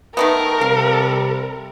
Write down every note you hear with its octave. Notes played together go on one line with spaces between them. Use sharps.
D#3 A3 B3 A#4
C3 G3 F5